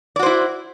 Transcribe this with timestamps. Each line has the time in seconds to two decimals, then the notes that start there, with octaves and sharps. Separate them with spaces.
0.16 D5
0.19 F#4
0.23 C5
0.26 E4